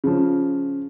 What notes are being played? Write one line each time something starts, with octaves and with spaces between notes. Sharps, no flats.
C#3 F3